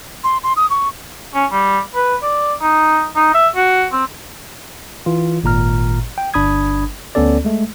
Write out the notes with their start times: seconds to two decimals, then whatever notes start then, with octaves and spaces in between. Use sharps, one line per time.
0.24 C6
0.43 C6
0.56 D#6
0.70 C#6
1.34 C#4
1.52 G3
1.95 B4
2.23 D5
2.62 D#4
3.16 D#4
3.34 E5
3.56 F#4
3.92 C4
5.06 E3 F4
5.44 G#1 A#2 A#5 F6
6.18 G5
6.34 G1 D4 B5 D#6 G#6
7.15 D2 B3 C#4 A4 D5
7.45 G#3 A3